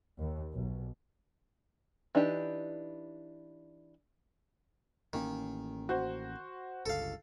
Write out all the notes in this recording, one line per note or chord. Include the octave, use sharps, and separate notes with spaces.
D#2
B1
E3 D4 D#4 G4
A1 D#3 A#3 C#4
F#4 C5
G1 C#2 A4 F5